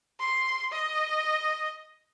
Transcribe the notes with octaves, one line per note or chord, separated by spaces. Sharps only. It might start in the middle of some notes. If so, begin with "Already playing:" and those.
C6
D#5